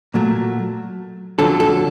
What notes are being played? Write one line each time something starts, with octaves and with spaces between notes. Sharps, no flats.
A#2 F#3 A3
F2 D3 F#3 A4
A4